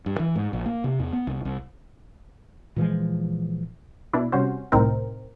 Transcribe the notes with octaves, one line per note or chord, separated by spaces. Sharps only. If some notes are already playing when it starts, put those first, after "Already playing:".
G2
E3
G#2
A#1
A#3
C3
E2
B3
C2
C2
A#2 E3 F3 G#3
B2 D4 E4
C3 G3 C#4 F#4 C5
C2 A2 C4 D#4 A#4